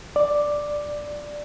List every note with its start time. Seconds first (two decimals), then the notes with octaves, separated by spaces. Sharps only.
0.16 D5